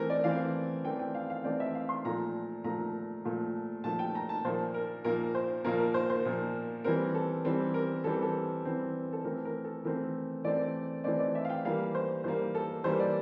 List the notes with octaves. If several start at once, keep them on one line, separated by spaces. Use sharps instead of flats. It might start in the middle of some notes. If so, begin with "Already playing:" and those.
Already playing: E3 A3 C4 A#4 C5
D5
E3 A3 C4 F5
E3 A3 C4 G5
G5
F5
F5
E3 A3 C4 D5
E5
F5
C6
A#2 F3 A3 A#5
A#2 F3 A3 A#5
A#2 F3 A3
A#2 F3 A3 A5
G5
A#5
A5
A#2 F3 A#3 C5
A#4
A#2 F3 A#3 A#4
C5
A#2 F3 A#3 A#4
A#4
C5
C5
A#2 F3 A#3
E3 G3 C4 A#4
A4
E3 G3 C4
A#4
E3 G3 C4 A4
A4
E3 G3 C4
A4
E3 A3 C4 A#4
A#4
A4
E3 A3 C4 A#4
E3 A3 C4 D5
E3 A3 C4 D5
D5
E5
F5
G5
E3 G3 A#3 F5
C5
E3 G3 A#3 C5
A4
E3 G3 A#3 C5
D5